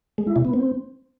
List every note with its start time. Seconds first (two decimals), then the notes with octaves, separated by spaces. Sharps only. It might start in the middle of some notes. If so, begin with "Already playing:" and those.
0.18 G#3
0.27 E4
0.36 C3
0.45 B3
0.54 C4